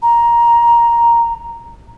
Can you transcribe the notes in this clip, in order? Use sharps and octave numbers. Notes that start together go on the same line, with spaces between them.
A#5